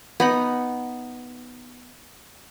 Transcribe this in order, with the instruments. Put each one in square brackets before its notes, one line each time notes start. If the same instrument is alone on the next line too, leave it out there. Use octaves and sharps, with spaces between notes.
[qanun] B3 D#4 B5